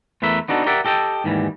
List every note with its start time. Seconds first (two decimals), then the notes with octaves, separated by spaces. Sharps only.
0.22 E2 A3 A#4 B4 E5
0.48 B3 D4 D#4 F#4 A4
0.66 G4 A#4 D5 E5 F#5
0.85 G4 A4 D#5 G5
1.24 D#2 G#2 E3 G3